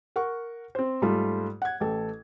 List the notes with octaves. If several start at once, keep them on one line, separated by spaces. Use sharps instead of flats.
A#4 F#5 C#6
C4 C5
G#2 G3 A3 F4
F#5 G#6
A1 A4